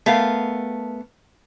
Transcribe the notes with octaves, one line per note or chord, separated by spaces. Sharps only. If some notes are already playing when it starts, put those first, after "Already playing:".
A3 B3 A#4 F5